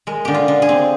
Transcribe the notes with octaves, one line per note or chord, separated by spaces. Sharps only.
G#3 A#4
D3 G4
F4
D3
G#4
C4